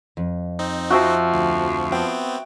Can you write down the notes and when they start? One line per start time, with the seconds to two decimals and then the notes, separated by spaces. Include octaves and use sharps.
0.17 F2
0.59 C4 D#4
0.90 F3 F#4 E5 G5
1.34 D2
1.92 B3 C4 G5